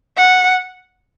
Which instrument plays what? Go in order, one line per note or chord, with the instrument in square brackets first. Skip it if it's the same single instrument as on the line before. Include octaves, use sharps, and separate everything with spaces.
[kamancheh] F#5